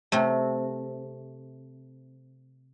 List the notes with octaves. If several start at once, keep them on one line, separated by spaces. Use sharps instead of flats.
C3 A3